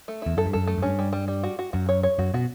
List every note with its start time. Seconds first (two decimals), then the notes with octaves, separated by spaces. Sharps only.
0.08 A3
0.22 E2 E4
0.37 F#2 A4
0.46 G2
0.53 F#2 A4
0.67 A3
0.78 F#2
0.82 G2 C#4
0.99 G3
1.13 G3
1.28 G3
1.43 F#4
1.59 F#4
1.73 F#2 F#4
1.89 C#5
2.03 C#5
2.19 F#2 F#4
2.34 B2 F#4